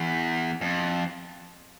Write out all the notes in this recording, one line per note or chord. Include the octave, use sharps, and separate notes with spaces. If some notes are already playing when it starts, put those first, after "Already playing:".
Already playing: E2
F2